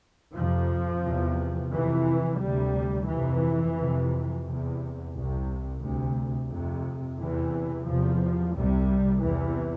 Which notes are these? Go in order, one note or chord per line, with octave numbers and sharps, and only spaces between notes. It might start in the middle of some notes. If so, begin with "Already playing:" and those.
F2 C3 F3
E2 C3
F2 C3 E3
D2 C3 G3
F2 C3 E3
F2 C3
E2 C3
C2 C3
D2 C3
F2 C3
E2 C3 E3
E2 C3 F3
C2 C3 G3
E2 C3 E3